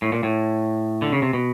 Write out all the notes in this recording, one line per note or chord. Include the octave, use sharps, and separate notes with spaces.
A2
A#2
A2
D3
C#3
C3
B2